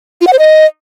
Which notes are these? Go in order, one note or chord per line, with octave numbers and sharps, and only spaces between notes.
F4
F#5
C5
D#5